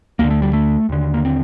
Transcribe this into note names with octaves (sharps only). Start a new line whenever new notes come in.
D2 D3 A#3
A3
G3
A3
D#2 D3
A#3
C4